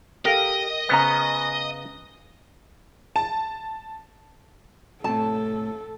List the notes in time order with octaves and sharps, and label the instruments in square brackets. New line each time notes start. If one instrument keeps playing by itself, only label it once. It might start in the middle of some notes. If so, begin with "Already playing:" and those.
[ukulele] G4 A4 F5 [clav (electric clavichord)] A#4 [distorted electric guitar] D#5
[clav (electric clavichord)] C#3 B3 [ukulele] C5 A#5
[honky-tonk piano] A5
[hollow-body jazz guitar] A2 C3 [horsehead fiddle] A4 [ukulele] A5